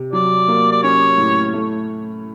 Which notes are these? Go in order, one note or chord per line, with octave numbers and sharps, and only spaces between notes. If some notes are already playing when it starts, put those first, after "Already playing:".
Already playing: C3
F#3 D5
A#3
D5
C#4 C#5
A2
A3